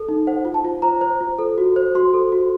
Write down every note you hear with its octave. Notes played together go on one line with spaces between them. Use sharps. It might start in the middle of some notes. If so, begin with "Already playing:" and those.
Already playing: A4
D#4
C5 F#5
F4
A5
F4
C5 A#5
C5
F4
A4
F#4
C5
F#4 C6
A4
F#4